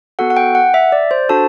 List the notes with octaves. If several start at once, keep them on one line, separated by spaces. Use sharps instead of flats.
B3 F#4 A4 F#5
F#5
G5
F#5
E5
D5
C5
D4 F#4 A4 A5